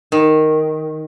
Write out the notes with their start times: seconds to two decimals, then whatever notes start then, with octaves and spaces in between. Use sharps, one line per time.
0.12 D#3